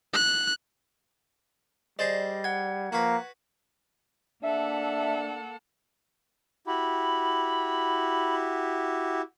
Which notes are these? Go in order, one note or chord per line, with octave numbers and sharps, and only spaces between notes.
F#6
G3 G#4 C5 D5 D#5 A6
F#5 G#6
F3 A#3 F#4 B4
A#3 D4 A4 E5 F#5
E4 F#4 G4 B5